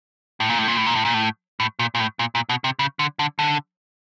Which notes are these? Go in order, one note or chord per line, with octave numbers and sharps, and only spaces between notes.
A2
A#2
A2
A#2
A2
A#2
A2
A#2
A2
A2
A#2
A#2
A2
A#2
A#2
B2
C3
C#3
D3
D3
D3